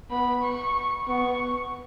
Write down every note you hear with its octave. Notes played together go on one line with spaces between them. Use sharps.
B3 B5
C#6
B3 C#6